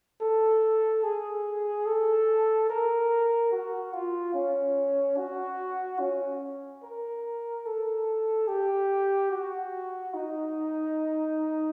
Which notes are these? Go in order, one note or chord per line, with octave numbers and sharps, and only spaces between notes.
A4
G#4
A4
A#4
F#4
F4
C#4
F#4
C#4
A#4
A4
G4
F#4
D#4